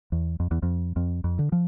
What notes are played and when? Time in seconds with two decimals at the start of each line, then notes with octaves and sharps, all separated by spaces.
0.12 E2
0.40 F2
0.51 E2
0.63 F2
0.96 F2
1.24 F2
1.39 D3
1.52 F3